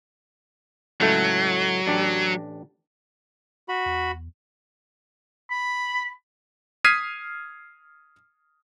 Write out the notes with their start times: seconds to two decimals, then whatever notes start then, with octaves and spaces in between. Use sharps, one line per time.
1.01 C#2 A2 F#3 A3
1.87 A1 D4 G4
3.69 F#4 B5
3.86 E2
5.51 B5
6.84 D#6 F6 G#6 B6 C7 D#7